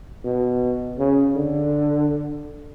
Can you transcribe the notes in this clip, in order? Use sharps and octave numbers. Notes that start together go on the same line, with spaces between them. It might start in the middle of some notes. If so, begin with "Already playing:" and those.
B2
C#3
D3